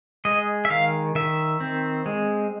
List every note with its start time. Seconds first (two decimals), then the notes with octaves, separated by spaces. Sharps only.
0.25 G#3 D#5
0.65 E5
0.70 D#3 F5
1.15 D#3 E5
1.60 C4
2.06 G#3